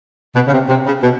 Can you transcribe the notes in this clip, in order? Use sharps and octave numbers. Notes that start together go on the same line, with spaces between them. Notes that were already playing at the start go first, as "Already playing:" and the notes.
B2
C#3
C3
C3
C#3
B2